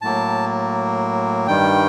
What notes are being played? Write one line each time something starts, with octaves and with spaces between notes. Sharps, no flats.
A2 F#3 A#3 A5
G2 D#3 G3 G5